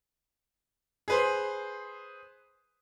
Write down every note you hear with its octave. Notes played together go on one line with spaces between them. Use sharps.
G#4 B4 C5